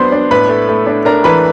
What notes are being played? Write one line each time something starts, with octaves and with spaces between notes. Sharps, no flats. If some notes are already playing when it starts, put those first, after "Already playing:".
Already playing: F#3 B3 D4 B4 C5 B5 C6
D4
A2 B4 B5
A3
A3
D4
D4 A#4 A#5
E3 B4 B5